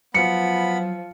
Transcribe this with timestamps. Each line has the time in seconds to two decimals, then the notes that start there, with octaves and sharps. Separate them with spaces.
0.14 F3 F#3 B3 B5 C#7